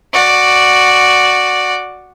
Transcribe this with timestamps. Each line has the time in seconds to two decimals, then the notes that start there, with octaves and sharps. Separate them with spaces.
0.13 F#4 D5